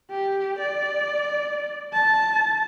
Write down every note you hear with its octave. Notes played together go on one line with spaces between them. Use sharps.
G4
D5
A5